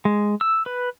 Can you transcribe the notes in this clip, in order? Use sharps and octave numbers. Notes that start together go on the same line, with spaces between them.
G#3
E6
B4